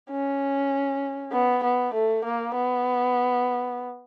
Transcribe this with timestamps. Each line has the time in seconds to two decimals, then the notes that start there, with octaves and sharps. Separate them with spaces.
0.10 C#4
1.32 B3
1.63 B3
1.94 A3
2.24 A#3
2.55 B3